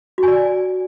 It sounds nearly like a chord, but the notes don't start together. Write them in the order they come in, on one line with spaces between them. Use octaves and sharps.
F#4 G#5 D5